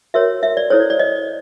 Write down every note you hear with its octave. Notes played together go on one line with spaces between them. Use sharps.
F#4 A#4 C#5 E5
E5
D5
E4 A4 C5 C#5
D5
D5
D#5